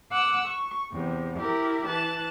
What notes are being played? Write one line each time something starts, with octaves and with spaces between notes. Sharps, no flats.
F#5 D6 E6 F#6
C#6
E2 C3
E4 G4 A#4
E3 A5 F#6